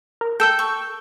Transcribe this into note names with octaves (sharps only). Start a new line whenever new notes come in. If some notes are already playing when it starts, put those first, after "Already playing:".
A#4
A4 G5 E6 G6
C#6